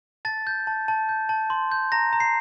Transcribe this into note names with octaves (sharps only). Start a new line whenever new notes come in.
A5 A6
G6
A5
A5
G6
A5
C6
G6
A#5 A#6
A#5
C7